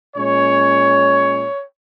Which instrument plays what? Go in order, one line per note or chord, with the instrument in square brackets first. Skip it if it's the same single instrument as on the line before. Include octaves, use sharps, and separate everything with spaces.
[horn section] A#2 G#3 C#4 C#5